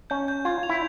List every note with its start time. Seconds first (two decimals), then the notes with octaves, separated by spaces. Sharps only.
0.10 C#4 G6
0.28 G6
0.45 F4 G#6
0.63 F7
0.69 E4